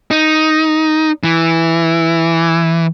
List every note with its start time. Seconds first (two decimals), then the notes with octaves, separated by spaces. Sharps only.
0.11 D#4
1.24 E3